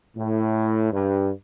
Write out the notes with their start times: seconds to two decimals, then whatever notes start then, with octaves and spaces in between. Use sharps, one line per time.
0.17 A2
0.91 G2